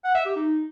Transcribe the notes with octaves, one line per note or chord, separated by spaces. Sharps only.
F#5
E5
G4
D#4